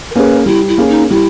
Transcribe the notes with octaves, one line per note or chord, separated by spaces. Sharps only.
A#4
A#3 C#4 G#4 B4
G3 E4
E4
A#3 C#4 G#4
D#4
G3 E4